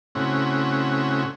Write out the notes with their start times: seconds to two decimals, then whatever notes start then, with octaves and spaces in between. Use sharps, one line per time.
0.15 A2 C#3 C4 C#4 E4 F#4